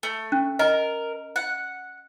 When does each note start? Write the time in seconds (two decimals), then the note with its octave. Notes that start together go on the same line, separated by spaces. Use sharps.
0.03 A3
0.32 C#4
0.59 A#4 D#5
1.36 F#5